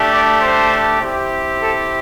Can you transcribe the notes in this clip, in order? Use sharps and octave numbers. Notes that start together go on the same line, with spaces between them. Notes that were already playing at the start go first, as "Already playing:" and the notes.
Already playing: A3 D4 G4
D5
C5
C4 E4 G4
A4